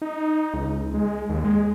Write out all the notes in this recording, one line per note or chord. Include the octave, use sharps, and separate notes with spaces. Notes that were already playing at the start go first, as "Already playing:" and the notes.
D#4
C#2
G#3
D#2
G#3